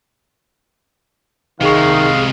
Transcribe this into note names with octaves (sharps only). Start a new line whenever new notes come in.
C2 C3 D#3 G#3 G#4 F5 C#6